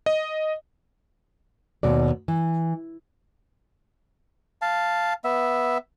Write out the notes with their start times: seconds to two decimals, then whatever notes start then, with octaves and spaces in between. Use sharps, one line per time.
0.06 D#5
1.83 D#2 B2 D5
2.28 E3
4.62 F5 A5
5.24 B3 E5